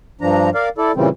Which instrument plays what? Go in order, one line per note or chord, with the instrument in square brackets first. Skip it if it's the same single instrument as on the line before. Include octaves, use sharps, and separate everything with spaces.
[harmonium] G2 F3 D4 A#5
A#4 D5 F5
E4 A4 D5
A#2 C#3 E3 G3 C4